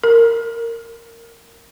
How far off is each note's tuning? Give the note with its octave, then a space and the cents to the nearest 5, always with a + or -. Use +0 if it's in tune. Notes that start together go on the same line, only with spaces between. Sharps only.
A#4 -15